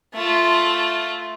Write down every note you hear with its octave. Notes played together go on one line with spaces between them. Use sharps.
A3 F4